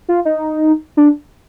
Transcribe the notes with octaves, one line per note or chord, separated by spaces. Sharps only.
F4
D#4
D4